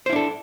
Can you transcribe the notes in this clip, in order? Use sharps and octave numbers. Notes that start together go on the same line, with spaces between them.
D4 E4 A4 C5